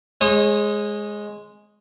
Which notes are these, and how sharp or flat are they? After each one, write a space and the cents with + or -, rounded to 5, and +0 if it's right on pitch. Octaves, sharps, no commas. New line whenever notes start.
G#3 +0 C#5 -35 D#6 +0